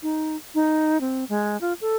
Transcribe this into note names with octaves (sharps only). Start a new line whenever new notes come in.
D#4
D#4
C4
G#3
F4
A4